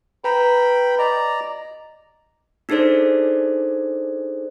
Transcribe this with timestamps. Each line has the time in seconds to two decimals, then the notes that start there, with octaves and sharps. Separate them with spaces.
0.24 B4 G5 A#5 B5
0.99 D5 D#5 A#5
2.69 D4 D#4 G#4 A4 C5 D5